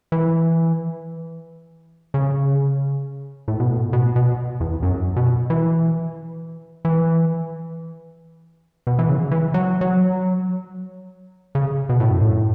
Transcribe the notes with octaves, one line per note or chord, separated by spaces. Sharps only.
E3
C#3
A2
B2
A2
B2
B2
E2
F#2
B2
E3
E3
B2
E3
C#3
E3
F#3
F#3
C#3
B2
A2
F#2
A2